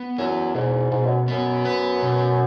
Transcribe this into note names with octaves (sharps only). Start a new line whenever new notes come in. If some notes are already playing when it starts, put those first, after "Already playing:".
Already playing: B3
F#2 E4
G#2 B2
G#2 B2
F#2
F#2 B3
B4
B2